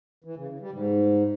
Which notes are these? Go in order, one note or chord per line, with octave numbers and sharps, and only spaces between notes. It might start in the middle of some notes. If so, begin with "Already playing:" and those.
E3
C#3
C#3
G3
G#2